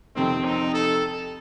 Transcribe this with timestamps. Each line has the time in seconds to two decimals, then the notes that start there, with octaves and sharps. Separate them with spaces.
0.15 F2 C3 D#3 C4
0.45 D#4
0.74 A4